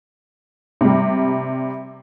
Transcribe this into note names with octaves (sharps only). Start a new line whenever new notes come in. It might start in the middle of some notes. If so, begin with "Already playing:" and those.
C3 G3